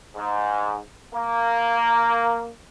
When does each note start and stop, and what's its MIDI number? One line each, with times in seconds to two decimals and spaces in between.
0.15 0.77 44
1.12 2.49 58